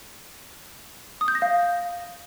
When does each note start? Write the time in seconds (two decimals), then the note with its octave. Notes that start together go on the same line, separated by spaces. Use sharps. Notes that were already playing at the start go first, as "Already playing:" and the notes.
1.21 D#6
1.28 G6
1.35 A#6
1.42 F5